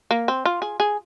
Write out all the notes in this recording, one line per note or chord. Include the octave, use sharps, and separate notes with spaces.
A#3
C4
F4
G#4
G#4